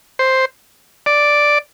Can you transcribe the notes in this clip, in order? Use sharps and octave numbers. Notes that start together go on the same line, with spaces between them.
C5
D5